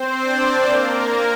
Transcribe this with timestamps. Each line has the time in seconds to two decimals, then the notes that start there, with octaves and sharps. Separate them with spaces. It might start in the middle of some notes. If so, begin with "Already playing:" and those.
Already playing: C4 C5
0.20 D4 D5
0.64 A#3 A#4